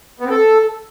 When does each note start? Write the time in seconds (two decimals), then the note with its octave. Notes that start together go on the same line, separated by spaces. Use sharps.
0.20 B3
0.25 C4
0.30 A4